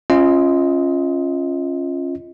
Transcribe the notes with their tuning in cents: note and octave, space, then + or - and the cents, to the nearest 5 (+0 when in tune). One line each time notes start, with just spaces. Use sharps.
C#4 -15 F4 -10 D#5 +25